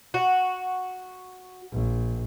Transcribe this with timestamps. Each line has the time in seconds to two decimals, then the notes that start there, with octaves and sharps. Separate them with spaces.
0.14 F#4
1.72 A#1